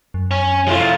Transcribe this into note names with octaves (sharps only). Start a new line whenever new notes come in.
F#2
C#4
F3 G#3 A3 E4 F4